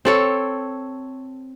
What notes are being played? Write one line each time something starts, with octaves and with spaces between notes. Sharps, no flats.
C4 A4 C#5